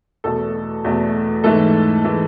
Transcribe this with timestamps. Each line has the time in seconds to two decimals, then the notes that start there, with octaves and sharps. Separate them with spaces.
0.24 E2 B2 A3 A4
0.84 E2 B2 A3
1.44 G#2 E3 A3 A4
2.05 E3 A3